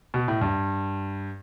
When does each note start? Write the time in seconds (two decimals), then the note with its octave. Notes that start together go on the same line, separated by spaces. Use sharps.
0.14 B2
0.28 A2
0.41 G2